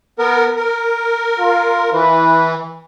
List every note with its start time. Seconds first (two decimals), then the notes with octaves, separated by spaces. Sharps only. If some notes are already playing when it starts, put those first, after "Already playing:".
0.19 B3 A#4
0.57 A#4
1.39 F4
1.93 E3 B4